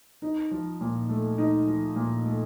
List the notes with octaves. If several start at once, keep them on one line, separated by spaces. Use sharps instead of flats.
D#4
F3
A#2
A3
D#4
F3
A#2
A3